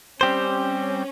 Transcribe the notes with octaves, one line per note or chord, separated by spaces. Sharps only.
G3 C4 C#4 G4 C5